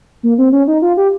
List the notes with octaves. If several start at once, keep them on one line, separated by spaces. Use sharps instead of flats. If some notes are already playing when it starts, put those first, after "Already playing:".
A#3
C4
C#4
D#4
F4
G4